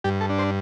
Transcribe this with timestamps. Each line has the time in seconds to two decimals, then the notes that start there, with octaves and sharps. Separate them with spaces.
0.04 G2 G4
0.21 A4
0.30 D4
0.38 C5